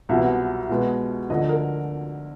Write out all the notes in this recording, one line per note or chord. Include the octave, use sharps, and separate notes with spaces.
C2 B2 F#3 B3 E5
B2 G#3 B3
D2 D3 F3 D#5
A#4